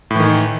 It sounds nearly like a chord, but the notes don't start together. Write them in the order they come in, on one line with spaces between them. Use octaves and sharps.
A2 E3 D#3